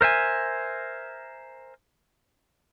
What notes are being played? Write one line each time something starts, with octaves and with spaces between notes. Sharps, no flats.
A#4 C5 E5 G#5